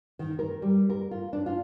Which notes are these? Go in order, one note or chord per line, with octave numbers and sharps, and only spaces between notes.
D#3
A#4
G3
A#4
F4
D4
F4